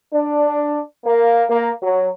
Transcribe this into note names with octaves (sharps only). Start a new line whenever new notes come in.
D4
A#3
A#3
F#3